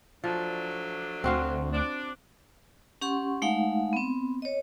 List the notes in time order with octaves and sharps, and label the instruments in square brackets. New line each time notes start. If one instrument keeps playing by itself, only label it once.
[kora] F3 [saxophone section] F#3 A3 D4
[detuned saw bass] D2 [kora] C4 F#4 F5
[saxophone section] D4
[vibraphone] C#4 G4 F#5 C6 C#6
G#3 A3 D#4 F5 F#5
B3 C4
C#5 D#5